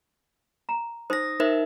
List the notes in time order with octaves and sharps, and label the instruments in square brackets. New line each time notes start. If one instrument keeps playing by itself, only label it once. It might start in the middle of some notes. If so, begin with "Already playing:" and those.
[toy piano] A#5
[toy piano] D#4 C5 [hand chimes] D#6 A#6
[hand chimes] D#4 A#4 E5 [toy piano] C5